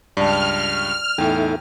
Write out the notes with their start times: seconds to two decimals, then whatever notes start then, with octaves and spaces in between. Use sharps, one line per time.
0.17 C#2 G2 D5 G5 A5 F6
1.18 E2 A2 D#4 A4 E5 G5